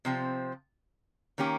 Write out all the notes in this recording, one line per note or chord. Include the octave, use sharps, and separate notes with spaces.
C3 F3 C4
D#3 A#3 C#4 G4 A#4